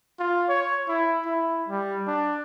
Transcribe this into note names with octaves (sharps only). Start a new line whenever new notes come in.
F4
C#5
E4
E4
G3
D4